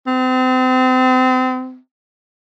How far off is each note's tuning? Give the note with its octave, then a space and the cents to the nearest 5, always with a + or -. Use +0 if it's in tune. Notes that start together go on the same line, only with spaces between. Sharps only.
C4 -35